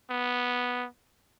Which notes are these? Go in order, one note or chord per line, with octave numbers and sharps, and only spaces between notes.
B3